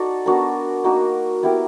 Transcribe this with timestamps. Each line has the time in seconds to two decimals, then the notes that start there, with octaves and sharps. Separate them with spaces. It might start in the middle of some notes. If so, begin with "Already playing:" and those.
Already playing: D#4 F#4 A4 D5
0.26 B3 D4 F#4 A#4
0.84 A#3 D#4 F#4 A#4
1.43 B3 E4 G4 A#4